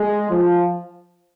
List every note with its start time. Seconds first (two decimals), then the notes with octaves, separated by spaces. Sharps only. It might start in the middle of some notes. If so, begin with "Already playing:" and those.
Already playing: G#3
0.29 F3